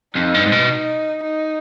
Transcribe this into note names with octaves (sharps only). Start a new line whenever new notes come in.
F2 D#4
G2
G#2
B2
D#4
D#4